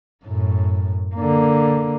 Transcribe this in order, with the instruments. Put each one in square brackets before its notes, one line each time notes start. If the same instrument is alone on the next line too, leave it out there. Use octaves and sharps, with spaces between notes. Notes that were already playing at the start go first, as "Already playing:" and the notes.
[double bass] F#2 A2
D3 A#3